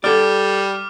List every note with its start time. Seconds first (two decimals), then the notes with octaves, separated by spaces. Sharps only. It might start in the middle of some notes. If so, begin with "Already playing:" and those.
0.04 G3 A4 D5 D6 F6